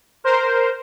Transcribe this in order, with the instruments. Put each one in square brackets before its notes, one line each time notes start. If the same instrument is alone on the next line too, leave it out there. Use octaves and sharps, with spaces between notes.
[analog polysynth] A#4 C5